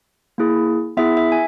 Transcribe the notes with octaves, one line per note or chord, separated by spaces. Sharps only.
A#3 E4 G#4
B3 E4 G#4 E5
E5
G#5